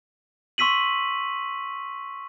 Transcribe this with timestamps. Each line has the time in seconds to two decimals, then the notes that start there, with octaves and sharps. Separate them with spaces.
0.58 C6 C#6 E6 B6 D#7 F#7